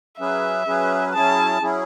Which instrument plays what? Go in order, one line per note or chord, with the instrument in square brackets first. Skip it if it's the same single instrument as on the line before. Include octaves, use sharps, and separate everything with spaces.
[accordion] F#3 C#4 G#4 B4 [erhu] E5
[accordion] F#3 C#4 G#4 B4
[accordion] F#3 C#4 E4 G#4 [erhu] A5
[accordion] F#3 C#4 E4 G#4